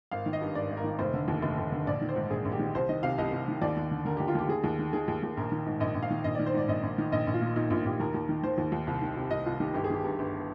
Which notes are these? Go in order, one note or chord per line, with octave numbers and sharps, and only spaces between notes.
G#1 F5
D#3
D#5
G2
G#1 D5
G#1
A#4
D#3
F1 C5
D3
D#2
F1
F1
D3
A#1 D5
D#3
C5
G#2
A#1 G#4
A#1
G4
D#3
C2 C5
D#3 D#5
C3 F5
C2 D#5
C2
D#3
D#2 D5
D#2
D3
D3 A#4
D#2 G4
F4
D#2 G4
D#2 G#4
D#2
D#3
D#3 G#4
D#2
D#2
A#1 A#4
D#3
G#2
A#1 D#5
A#1
F5
D#3
A#1 D#5
D#3 D5
C5
G#2 D5
A#1 D#5
A#1
D#3
A#1 D#5
A#1
F4
A#2
A#2 D#4
A#1 F4
A#1 G4
D#2 A#4
D#2
D#3
D#3 C5
D#2
D#2
C2
D#3
C3
C2 D#5
C2 F4
D#3 G4
G1 G4
G#4
D#3 G4
G2
G1